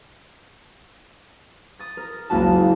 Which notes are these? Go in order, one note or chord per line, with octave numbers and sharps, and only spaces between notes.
D#6 A6
A#4
F#1 C#2 A#3 E4 F#4 A5